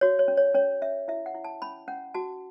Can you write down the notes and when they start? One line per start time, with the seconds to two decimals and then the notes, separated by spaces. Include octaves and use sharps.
0.01 F#4 C#5
0.19 C#5
0.28 C#4
0.37 C#5
0.55 C#4 C#5
0.82 C#4 E5
1.08 E4 E5
1.26 F#5
1.35 E4
1.44 A5
1.62 C#4 B5
1.88 C#4 F#5
2.14 F#4 A5